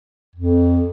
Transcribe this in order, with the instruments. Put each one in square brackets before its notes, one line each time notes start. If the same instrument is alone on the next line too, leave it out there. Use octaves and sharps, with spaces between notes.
[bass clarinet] F2